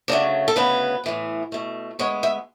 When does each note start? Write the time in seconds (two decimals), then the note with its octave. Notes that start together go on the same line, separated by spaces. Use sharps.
0.08 D2 C#3 F#3 A3 D4
0.48 A4
0.56 D2 C#3 F#3 B3 B4
1.04 A2 E3 B3
1.52 B2 A3
1.99 D2 C#3 G#3 B3 C#5
2.23 E5